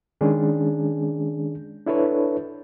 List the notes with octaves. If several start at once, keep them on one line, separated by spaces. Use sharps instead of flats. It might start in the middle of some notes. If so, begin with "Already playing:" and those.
D#3 G#3 C#4 D4 G#4
D4 E4 A4 B4 C#5